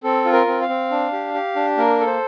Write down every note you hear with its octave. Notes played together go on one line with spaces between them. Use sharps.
C4 A4
F4
A#4
C4
F5
C4
D4
G4
G4
D4
A#3 A#4
A4
C5